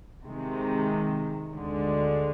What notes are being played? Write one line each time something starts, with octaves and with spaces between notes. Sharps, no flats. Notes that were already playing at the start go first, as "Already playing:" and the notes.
C3 D#3 G#3
D2 D3 G#3